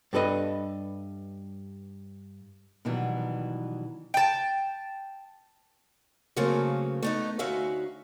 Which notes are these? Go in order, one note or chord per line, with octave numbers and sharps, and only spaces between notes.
G2 D4 A4 B4 D#5
B2 D#3 E3 F#3 G3
G5 A5
C#3 F#3 A3 A#3 C4 C#4
A3 B3 D#4
D2 C#4 D#4 F#4 E5 F5